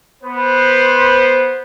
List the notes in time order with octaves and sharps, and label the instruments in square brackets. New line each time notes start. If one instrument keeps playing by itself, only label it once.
[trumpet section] B3 B4 C5